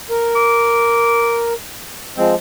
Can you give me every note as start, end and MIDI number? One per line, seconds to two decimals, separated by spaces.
0.10 1.53 70
0.36 1.46 86
2.17 2.35 53
2.17 2.35 56
2.17 2.33 60